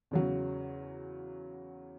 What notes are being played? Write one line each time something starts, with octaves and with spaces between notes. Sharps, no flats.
E2 C#3 F#3